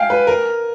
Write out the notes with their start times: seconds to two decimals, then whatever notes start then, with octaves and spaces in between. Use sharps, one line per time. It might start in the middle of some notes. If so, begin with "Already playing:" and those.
Already playing: F5 G5 G#5
0.10 B4
0.27 A#4